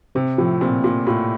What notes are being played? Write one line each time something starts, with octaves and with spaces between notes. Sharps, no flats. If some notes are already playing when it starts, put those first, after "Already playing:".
C3 C4
A2 F3
A#2 C4
A#2 F4
A2 F4